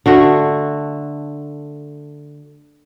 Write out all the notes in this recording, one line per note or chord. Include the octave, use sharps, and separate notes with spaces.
D3 A3 F#4